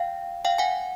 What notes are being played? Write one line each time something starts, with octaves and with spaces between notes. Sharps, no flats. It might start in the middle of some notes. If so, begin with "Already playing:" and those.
Already playing: F5 G5
F5 G5
F#5 G#5